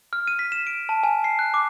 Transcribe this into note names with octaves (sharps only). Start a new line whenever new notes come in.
F6
D#7
B6
E7
D7
A5
G#5
C7
F#6
D6